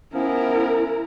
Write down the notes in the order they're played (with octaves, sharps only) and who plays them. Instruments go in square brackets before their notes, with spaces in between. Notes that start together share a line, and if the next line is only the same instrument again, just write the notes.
[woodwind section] F3 B3 C#4 [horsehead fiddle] E4 A#4